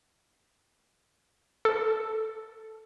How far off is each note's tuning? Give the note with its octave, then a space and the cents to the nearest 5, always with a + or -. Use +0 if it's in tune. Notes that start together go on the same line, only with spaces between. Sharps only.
A4 +0